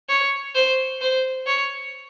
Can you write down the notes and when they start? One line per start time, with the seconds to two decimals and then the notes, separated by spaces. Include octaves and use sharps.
0.09 C#5
0.55 C5
1.01 C5
1.47 C#5